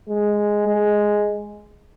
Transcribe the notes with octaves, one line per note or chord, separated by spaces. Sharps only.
G#3
G#3